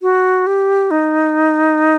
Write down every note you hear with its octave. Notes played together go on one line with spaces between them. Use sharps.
F#4
G4
D#4